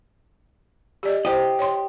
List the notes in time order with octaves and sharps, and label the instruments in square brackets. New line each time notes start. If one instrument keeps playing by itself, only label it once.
[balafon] G4 D5 D#5
[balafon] E4 C5 [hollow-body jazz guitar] G4 D#5
[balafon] C#5 C6